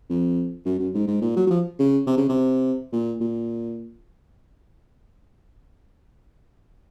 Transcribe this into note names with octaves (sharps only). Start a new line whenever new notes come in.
F2
F#2
F#2
G#2
G#2
A#2
F#3
F#3
F3
C#3
C3
C#3
C3
A#2
A#2